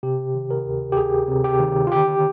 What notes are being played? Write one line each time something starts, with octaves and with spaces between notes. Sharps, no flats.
C3 G4
D#3
A#4
D2
G4
D2 G#4
C3
G4
D#3
F4
D3 G4